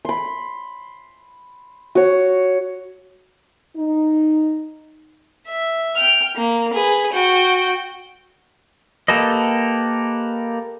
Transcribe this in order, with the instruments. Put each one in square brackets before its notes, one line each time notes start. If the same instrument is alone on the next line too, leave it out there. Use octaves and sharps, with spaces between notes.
[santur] B5 C6
F#4 C#5
[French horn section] D#4
[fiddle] E5
G5 F6
A#3
G#4 B4
F#4 G5
[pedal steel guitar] A#3 G4 A4 B4 D#5